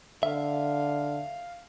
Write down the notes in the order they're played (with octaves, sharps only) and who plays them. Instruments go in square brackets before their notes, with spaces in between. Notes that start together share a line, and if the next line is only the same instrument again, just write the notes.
[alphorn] D3 [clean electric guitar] E5 [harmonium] F5